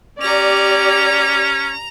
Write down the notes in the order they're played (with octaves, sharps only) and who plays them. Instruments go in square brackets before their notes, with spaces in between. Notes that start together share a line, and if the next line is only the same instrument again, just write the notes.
[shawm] C#4 [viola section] G4 D5 [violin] A#5 F7